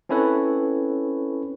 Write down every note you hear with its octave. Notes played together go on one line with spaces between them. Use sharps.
C4 C#4 E4 A4 B4 C#5